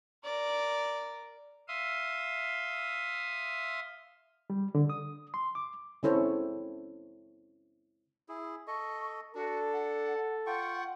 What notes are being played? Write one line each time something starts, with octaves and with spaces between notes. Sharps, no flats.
A#4 D5
E5 F5 C6 D#6
G3
D3
D#6
C6
D6
C#3 C4 E4 A4 C5 C#5
E4 G#4
A4 D#5 C#6
D4 F#4 A4
F#5
F4 F#5 G5 C#6